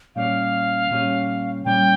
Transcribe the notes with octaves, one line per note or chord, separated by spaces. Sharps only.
A#2 G3 C#4 G4 F5
A#2 G3 C#4 G4
A#2 G3 C#4 G4 G5